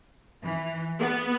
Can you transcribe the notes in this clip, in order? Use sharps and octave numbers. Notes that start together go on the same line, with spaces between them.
E3
B3